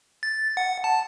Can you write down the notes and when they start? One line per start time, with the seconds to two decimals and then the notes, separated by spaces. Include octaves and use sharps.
0.23 A6
0.57 F#5
0.84 A5